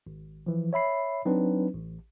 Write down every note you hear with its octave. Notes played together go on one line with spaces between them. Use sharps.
G#1
E3 F3
C#5 E5 B5 C7
F#3 C4 D4 D#4 B4
A1